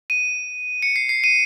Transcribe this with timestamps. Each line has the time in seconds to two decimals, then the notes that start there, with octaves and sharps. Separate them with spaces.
0.10 D#7
0.83 C#7
0.96 C7
1.09 C7
1.24 D#7